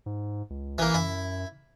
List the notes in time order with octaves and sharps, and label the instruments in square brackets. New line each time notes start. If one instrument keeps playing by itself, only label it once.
[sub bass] G#2
C#2
[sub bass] A1 [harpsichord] E3 A#3
[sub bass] F#2 [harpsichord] E4